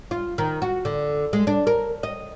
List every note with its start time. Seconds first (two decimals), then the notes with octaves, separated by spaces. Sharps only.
0.11 F4
0.38 D#3
0.62 F#4
0.85 D3
1.33 G#3
1.47 D4
1.67 A#4
2.03 D#5